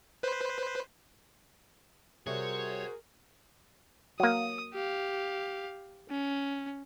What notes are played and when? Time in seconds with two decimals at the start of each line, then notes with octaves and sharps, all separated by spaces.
0.23 B4 C5
2.27 C3 G3 F#4 G#4 A#4 C5 C#5 E5
4.20 F#3 A#3 D#6
4.74 G4 F5
6.10 C#4